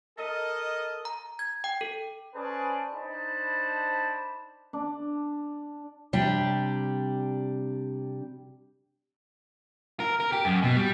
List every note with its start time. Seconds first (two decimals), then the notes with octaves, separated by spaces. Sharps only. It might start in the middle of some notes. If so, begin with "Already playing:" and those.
0.17 A4 A#4 D#5
1.05 A#5
1.39 G#6
1.64 G5
1.81 A4
2.35 C#4 G#4 B4 C5 D5 A5
2.94 D4 D#4 C5 A5 B5
4.73 D4
6.13 C3 G3 D4
10.00 A#4
10.20 A#4
10.32 G4
10.45 F#2
10.62 B2
10.76 G3